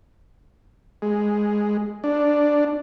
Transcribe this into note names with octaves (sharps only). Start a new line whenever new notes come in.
G#3
D4